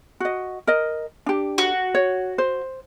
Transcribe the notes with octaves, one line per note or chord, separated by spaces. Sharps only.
F#4 D#5
A#4 D#5
D4 G4
F#4
C#5
C5